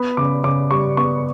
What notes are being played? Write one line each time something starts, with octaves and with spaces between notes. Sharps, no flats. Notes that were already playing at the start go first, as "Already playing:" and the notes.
Already playing: B3 B5
C#3 D6
C#3 D6
G3 C#6
B3 C#6